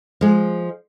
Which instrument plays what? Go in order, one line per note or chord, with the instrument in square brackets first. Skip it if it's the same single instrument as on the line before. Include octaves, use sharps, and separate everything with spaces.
[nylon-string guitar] F3 G#3